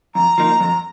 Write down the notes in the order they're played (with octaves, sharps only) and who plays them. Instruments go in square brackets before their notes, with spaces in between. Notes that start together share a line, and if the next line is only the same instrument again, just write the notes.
[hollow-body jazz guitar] F2 [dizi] A#5
[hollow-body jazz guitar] F3 A#3 D#4
F2